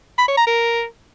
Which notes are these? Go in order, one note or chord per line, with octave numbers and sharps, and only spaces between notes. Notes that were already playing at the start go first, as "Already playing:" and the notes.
B5
C#5
A#5
A#4